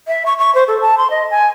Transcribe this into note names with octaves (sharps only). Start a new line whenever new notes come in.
E5
C#6
C#6
C5
A4
A5
C6
D#5
G#5